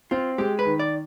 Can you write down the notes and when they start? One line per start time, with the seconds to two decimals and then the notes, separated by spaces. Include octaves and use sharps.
0.11 C4 F4
0.38 G#3 G4
0.59 B4
0.65 D#3
0.79 D5